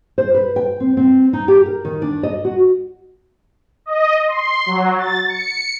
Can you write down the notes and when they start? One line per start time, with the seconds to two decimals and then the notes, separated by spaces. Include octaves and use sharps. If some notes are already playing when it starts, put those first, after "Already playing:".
0.18 C5
0.34 B4
0.56 G5
0.80 C4
0.97 C4
1.33 D#4
1.48 G4
1.66 A#4
1.85 D#3
2.02 D4
2.23 D#5
2.45 F#4
3.86 D#5
4.28 C6
4.66 F#3
4.98 A6
5.29 C#7